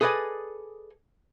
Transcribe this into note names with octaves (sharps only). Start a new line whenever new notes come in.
G#4 A4 B4 D5 D#5 G#5